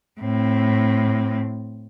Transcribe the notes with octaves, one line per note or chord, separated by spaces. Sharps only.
A2 C4